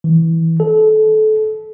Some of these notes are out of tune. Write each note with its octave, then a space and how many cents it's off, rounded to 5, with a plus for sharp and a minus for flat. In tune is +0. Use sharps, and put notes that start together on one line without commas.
E3 -10
A4 -25